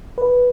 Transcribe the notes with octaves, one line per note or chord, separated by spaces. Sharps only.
B4